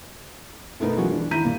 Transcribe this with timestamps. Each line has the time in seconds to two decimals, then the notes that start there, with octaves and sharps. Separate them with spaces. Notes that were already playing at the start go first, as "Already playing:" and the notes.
0.80 B2 A3 B3 D#4 A#4 B4
0.96 E3 F#3 G#3 C#4 F4 F#4
1.09 E3 D4
1.31 G#1 E4 A#5 G6 B6 D#7
1.44 A#2 G3 A#3